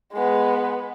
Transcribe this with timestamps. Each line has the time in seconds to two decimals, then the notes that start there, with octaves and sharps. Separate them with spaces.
0.13 G#3 B3